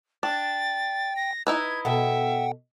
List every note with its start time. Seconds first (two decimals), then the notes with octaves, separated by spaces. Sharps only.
0.23 D4 G5 A6
1.16 A#6
1.47 D#4 E4 B4 G#6
1.85 B2 A4 E5 F#5 G5